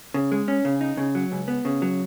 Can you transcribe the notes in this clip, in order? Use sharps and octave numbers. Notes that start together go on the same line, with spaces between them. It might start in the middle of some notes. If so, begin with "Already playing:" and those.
C#3
G#3
C#4
C#3
D#4
C#3
F#3
C#2
B3
C#3
F#3